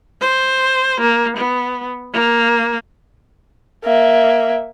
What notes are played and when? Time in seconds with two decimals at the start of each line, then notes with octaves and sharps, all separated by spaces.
0.21 C5
1.01 A#3
1.37 B3
2.13 A#3
3.85 A#3 E5